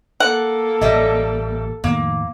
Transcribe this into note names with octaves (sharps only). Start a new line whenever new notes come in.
A#3 A4 F#5
A1 A#2 G3 D#5 E5
F2 A2 D#3 A#3